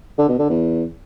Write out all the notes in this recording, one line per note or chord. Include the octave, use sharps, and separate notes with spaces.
D3
B2
D3
E2